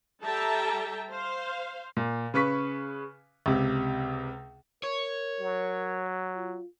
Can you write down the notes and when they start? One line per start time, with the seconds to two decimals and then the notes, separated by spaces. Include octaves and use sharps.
0.22 G3 A4 E5 G5 A5 A#5
1.10 C5 F5
1.97 A#2
2.34 C#3 B4 C#6 B6
3.46 C#2 C3
4.84 A#4 C#5
5.40 F#3
6.36 F4